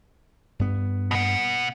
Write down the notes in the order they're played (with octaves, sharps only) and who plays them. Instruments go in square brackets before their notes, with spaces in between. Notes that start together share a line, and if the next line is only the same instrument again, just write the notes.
[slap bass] G2 B3
[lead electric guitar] B2 F#5